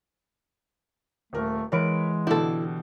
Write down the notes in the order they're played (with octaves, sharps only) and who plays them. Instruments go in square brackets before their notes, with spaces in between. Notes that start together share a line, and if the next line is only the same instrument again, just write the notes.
[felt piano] D#1 A#4 [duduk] A3
[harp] E3 F#5 D7 [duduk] G#3 [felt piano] A#4 C#5 B5
[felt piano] B2 D3 [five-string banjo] E4 A4 [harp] G4